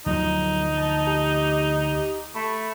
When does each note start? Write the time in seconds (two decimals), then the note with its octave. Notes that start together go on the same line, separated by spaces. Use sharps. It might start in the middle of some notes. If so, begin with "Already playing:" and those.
0.06 D2 F3 F#3 D#4
0.77 A5
1.07 G4
2.35 A3 B5